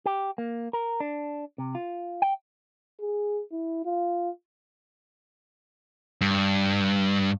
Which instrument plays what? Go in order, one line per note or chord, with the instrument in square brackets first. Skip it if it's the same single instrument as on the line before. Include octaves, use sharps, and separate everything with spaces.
[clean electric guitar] G4
A#3
A#4
D4
C3
F4
G5
[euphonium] G#4
E4
F4
[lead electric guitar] G2